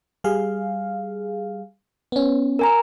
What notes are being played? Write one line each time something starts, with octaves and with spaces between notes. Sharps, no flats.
G3 G#4 F5
B3 C#4
A#4 G#5 A#5